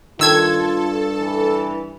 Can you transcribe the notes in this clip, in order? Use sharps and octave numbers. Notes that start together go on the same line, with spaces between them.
G2 D#3 F4 A4 A5 E6 G#6
E3